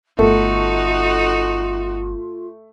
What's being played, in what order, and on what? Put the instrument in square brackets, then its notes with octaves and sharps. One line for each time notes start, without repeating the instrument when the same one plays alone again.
[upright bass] G1 [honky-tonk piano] A3 [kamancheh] D#4 F#4 [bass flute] F4